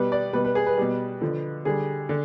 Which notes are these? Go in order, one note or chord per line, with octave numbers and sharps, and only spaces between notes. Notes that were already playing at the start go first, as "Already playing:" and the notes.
Already playing: B2 G3 B4
D5
B2 G3 B4
B4
G#4
B4
B2 G3
D3 F3
D3 G3 G#4
D3